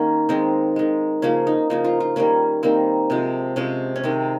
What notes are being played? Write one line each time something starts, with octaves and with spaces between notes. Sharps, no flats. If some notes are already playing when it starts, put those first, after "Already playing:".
Already playing: D#3 A#3 C#4 G4
D#3 G#3 C4
D#3 G#3
C#3 F3 A#3 C#4
D#4
C#3 F3 A#3 D#4
F4
F4
D#3 G3 A#3 C#4
D#3 G3 A#3 C4
C3 F3 G#3
C3 F3 G#3 C#4
C#4
C3 D#3 G#3 C4